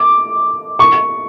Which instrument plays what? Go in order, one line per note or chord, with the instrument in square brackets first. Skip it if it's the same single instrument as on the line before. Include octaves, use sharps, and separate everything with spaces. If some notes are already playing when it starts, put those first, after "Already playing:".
Already playing: [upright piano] D6
C#6